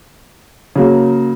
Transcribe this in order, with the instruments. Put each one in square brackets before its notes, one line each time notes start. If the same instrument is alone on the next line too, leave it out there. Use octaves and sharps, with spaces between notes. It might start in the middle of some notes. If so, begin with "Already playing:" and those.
[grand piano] C#3 F#3 A#3